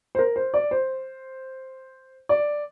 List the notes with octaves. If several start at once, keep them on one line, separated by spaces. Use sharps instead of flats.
C5
A#4
C5
D5
C5
D5